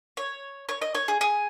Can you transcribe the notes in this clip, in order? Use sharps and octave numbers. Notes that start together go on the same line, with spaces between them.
C#5
C#5
D#5
C#5
G#4
G#4